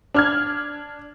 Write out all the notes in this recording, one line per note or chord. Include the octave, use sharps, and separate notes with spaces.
D4 F6 G#6